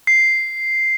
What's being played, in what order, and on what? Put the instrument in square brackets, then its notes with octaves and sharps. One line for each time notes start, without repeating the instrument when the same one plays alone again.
[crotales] C7